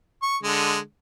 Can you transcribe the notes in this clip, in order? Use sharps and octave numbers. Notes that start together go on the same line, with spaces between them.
C#6
D3 G#3